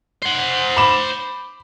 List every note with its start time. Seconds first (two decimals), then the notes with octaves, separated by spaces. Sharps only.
0.23 C5 F#5
0.77 B5 D6 E7